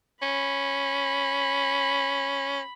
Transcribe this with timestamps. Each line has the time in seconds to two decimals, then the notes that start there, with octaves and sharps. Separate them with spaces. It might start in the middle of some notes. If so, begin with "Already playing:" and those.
0.22 C#4 B5